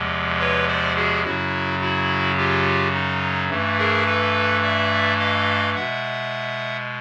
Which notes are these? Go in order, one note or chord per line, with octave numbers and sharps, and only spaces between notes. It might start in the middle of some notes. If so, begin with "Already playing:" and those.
Already playing: E2 C3 F3 G#3
B4 C#5
C5 D5
F#4 G#4
F#2 C#3 F#3 E4 F#4
E4 F#4
F4 G4
D#4
G2 E3 A3
G#4 A#4
A4 B4
D5 E5
D#5 F5
B2 G#3 E5 F#5